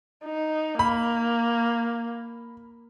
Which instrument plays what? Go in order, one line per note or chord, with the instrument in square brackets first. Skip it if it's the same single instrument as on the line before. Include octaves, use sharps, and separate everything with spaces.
[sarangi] D#4
[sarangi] A#3 [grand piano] B5